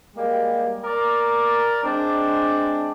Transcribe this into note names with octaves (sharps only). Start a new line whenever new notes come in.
G3 G#3 A#3 G4
A#4 D5
G#3 C4 D4